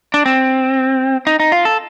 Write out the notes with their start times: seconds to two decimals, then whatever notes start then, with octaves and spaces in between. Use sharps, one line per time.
0.14 D4
0.26 C4
1.27 D#4
1.40 D#4
1.52 F4
1.65 A4